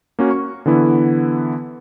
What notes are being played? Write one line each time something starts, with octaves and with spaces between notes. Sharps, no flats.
A#3 C#4 F#4
C#6
D3 E3 B3 E4